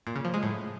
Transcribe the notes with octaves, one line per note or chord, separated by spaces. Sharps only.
A#2
C#3
F3
G#3
A2